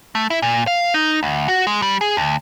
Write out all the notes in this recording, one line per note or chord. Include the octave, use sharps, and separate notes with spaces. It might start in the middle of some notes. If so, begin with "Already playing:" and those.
A3
E4
A#2
F5
D#4
D2
F#4
G#3
G3
G#4
D2